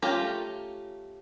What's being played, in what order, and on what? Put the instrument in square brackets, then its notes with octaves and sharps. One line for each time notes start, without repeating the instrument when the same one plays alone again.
[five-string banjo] A3 C#4 F4 G4 A#5